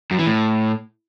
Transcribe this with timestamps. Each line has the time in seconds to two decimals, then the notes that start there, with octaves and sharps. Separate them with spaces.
0.11 F#2
0.19 E3
0.26 A2